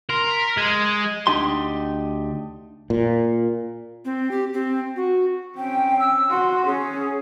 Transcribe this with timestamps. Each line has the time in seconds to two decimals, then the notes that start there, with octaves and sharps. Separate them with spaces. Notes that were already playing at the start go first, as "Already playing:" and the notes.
0.09 A#4 C6
0.30 B6
0.57 G#3 G#6
1.27 D2 D4 D#4 G4 C6
2.90 A#2
4.05 C4
4.31 G4
4.53 C4
4.96 F#4
5.58 C4 C#4 G5
6.00 E6
6.30 F#4 C6
6.66 C#4 G#4